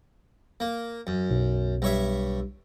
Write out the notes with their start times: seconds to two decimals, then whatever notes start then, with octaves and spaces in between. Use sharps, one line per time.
0.60 A#3
1.07 F#2
1.30 B1
1.82 G2 C#5 E5